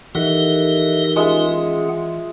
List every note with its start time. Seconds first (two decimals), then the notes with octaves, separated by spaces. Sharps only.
0.15 E3 D#4 G4 A4 A#4 D#5 E5 F#5
1.16 G#3 C#4 F4 G#4 E5 F#5